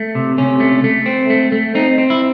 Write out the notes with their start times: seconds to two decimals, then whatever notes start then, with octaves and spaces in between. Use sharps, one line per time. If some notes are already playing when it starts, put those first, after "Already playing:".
Already playing: A3
0.15 C3
0.38 C3 C#4
0.60 A3
0.84 A3
1.06 C4
1.30 A3
1.52 A3
1.75 C4 D#4
1.98 C4
2.10 E4